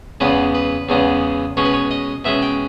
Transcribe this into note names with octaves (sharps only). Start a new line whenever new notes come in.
E2 C#3 G#3 B3 B4
B4
E2 C#3 G#3 B3
B2 G#3 C#4 C#5
B4
C#5
D#5
B2 G#3 C#4 E5
G5